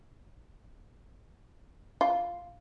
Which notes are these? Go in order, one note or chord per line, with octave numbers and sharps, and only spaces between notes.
F4